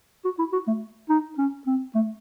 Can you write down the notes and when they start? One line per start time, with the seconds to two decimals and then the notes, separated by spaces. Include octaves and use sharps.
0.25 F#4
0.39 E4
0.52 F#4
0.67 A3
1.09 D#4
1.38 C#4
1.66 C4
1.95 A3